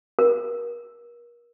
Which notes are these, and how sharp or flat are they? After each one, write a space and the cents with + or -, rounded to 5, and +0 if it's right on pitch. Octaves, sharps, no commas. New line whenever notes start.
A#4 +35